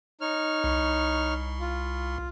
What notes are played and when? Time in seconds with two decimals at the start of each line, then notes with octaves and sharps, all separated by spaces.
0.21 D#4 C#5 F6
0.64 C2
1.60 F4